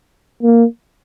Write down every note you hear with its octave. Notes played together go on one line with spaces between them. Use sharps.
A#3